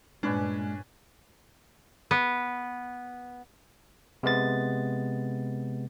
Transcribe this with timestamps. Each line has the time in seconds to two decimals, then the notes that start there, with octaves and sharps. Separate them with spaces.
0.23 G2 A#2 G#3 C#4 D4 B4 G#5
2.11 B3
4.23 C3 G#3 B3 A6